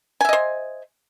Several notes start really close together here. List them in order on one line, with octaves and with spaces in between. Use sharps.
G#5 E5 D#5 C5